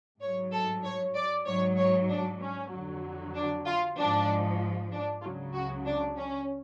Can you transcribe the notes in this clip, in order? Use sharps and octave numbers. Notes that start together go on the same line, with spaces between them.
G#2 F#3 C#5
A4
C#5
D5
G#2 F#3 C#5
C#5
D4
C#4
F2 D3 F#3
D4
F4
G#2 F3 D4
D4
C#2 C#3 F#3 F4
F#4
D4
C#4